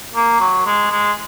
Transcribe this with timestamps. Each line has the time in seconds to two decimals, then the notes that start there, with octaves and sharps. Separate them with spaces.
0.15 A#3
0.40 F#3
0.66 G#3
0.91 G#3